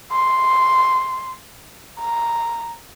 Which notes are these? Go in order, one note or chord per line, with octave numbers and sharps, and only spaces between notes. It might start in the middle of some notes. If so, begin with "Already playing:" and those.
C6
A#5